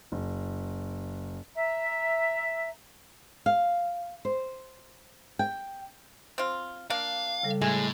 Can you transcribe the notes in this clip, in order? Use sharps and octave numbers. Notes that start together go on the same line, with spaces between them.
F#1
E5 A#5
F5
C5
G5
C4 F4
A#3 D4 F5
C#3 G3 A4
A2 G#3